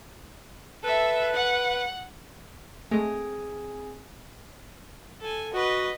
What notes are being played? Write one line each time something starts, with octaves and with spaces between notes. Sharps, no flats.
A4 B4 E5
F#5
G#3 A3 C4 G#4 G#5
A4 G#5
F#4 B4 D#5